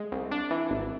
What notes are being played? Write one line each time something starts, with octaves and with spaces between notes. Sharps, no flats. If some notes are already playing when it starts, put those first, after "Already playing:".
Already playing: G#3
C2
D4
E3
G#1